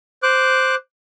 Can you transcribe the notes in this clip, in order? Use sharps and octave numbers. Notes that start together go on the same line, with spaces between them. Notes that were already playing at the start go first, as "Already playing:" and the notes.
C5 D6 F#6